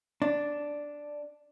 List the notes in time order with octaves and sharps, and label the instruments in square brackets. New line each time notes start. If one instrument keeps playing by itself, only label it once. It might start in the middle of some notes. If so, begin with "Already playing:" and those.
[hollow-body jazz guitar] D4